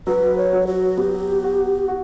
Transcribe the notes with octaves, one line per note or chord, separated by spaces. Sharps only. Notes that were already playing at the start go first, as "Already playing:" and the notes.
F#3 B4
C#5
F#3
F#4
B3 G4
F#4
F#4